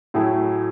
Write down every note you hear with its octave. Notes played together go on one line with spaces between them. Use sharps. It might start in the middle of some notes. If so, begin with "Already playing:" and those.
A2 F#3 A3 E4 G#4